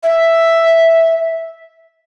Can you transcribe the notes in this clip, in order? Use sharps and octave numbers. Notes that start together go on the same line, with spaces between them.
E5